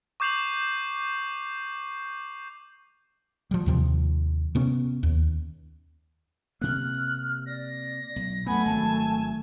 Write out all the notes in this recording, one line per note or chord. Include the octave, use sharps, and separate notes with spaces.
C#6 D6 G6 C7 F7 F#7
F3 G3
D#2 C3 F3
C3 B3 C#4
D#2
C3 A#3 F6 F#6
D5 A#6
B1
F#2 A3 B3 F#5 G#5 B5
G#1 F#3 A5